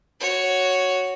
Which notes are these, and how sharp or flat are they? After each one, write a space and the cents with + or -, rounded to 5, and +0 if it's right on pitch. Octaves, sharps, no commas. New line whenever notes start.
F#4 +0 C#5 +0